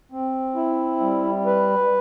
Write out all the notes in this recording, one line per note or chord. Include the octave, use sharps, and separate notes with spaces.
C4
E4
G3
B4